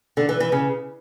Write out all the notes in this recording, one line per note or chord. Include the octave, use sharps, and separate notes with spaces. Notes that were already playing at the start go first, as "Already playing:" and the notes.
D3
E3
E3
C#3